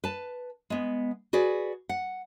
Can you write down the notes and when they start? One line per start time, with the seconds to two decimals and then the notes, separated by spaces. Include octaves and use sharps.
0.04 B4 A5
0.70 G#3 B3
1.33 F#4 G#4 B4 D5
1.89 F#5